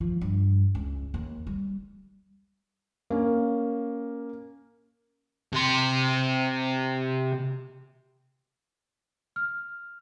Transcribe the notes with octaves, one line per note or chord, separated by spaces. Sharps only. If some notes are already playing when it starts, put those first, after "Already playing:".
F3
G2
C#2
D#2
G3
A#3 C#4
C3 C6
F6